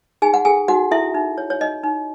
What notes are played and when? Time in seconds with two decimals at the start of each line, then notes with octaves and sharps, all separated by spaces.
0.22 D#4 G#4 G#5
0.34 F#5
0.45 G#4 A4 G#5
0.68 D#4 F#4 F#5
0.91 E4 A4 E5
1.15 D#4
1.38 C#5
1.50 C#5
1.61 D#4 D#5
1.84 D#4